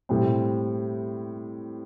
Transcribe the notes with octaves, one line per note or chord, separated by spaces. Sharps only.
A2 G3 C4